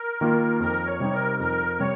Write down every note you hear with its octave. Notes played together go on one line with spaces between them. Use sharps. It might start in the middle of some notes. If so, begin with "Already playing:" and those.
Already playing: A#4
D#3 A#3 F4
F2 A#4
C#5
C3 G3 C4 D#4
A#4
F2 A#4
C3 G3 C4 C#5